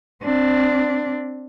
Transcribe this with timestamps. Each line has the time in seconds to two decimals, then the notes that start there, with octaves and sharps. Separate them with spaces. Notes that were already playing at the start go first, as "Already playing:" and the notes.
0.23 C4 D4